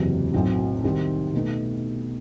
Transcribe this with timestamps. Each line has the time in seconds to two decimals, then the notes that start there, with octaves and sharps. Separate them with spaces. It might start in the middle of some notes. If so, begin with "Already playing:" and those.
Already playing: F#1 E2 C3 F#3
0.34 B1 A2 F#3 C4
0.83 C2 C3 D#3 G3 C4
1.33 B2 A3 D#4